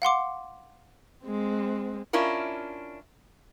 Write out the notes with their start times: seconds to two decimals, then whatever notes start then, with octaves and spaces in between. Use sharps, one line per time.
0.02 F5 F#5 C6 D6
1.25 G#3 C4
2.13 C#4 D4 E4 F4 A#4